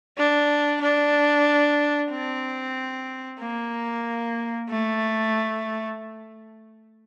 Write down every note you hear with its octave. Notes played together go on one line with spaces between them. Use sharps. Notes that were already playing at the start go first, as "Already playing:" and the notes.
D4
D4
C4
A#3
A3